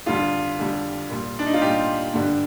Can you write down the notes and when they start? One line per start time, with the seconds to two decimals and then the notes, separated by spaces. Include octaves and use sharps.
0.06 F2 D3 G3 F4
0.58 F2 D3 G3
1.10 A#2 G3
1.39 D4
1.46 D#4
1.54 F4
1.62 A#2 G3 G4
2.13 G2 D3 G3